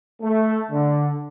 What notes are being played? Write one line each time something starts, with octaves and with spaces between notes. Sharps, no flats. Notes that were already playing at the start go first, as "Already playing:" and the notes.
A3
D3